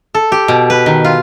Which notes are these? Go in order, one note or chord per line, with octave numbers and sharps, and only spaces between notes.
A4
G4
B2
B4
D#3
F4